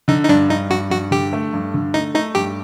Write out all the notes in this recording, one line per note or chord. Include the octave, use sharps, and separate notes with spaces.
D3 D#4
D#4
G2 D4
G2 D#4
G2 F#4
G2 F#4
D3 G4
A3
G2
D3
A3 D#4
A3 D#4
G2 G4